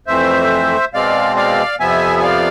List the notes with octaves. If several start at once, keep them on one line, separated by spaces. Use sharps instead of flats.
F2 E3 A3 C4 C5 E5
B2 G#3 C4 D5 F5
D5 F5
F2 C3 F3 B3 E5 G#5
G#5
D5 F5